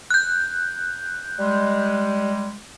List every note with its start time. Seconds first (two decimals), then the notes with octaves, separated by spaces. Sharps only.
0.10 F#6 G6
1.39 G3 G#3